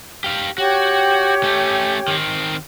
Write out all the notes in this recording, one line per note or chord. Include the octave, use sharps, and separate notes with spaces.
G4 F5
F#4 G4 C#5 G5
A3 C#4
D#3 C4